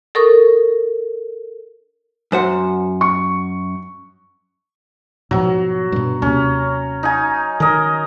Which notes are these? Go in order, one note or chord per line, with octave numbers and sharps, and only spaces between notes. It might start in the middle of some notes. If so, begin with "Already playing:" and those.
A4 A#4 C#6 D#6
F#2 C5 F#5
C#6
G#2 B2 F3 F#3
G2 B2
D#2 C3 C#4
D#4 G#5
D#3 A#4 D#5